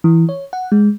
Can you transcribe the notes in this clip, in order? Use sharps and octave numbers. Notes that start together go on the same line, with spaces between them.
E3
C#5
F#5
G#3